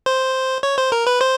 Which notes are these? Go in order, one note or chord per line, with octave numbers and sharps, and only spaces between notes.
C5
C#5
C5
A#4
B4
C5